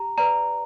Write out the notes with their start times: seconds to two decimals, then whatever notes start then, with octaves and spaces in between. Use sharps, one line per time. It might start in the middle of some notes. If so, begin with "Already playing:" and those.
Already playing: G4 A#5
0.18 B4 D5 A#5